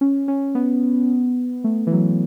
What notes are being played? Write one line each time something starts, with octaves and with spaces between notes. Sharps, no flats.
C#4
C#4
B3
A3
E3
F#3